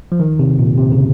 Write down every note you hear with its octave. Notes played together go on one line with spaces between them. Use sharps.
F3
D#3
C3
A#2
C3
C#3